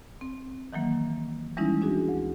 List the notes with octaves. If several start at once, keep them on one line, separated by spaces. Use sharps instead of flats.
C4
D#3 E3 F#3 A#3
E3 G3 G#3 C#4 D#4 E4
D4 F#4 G#4
D2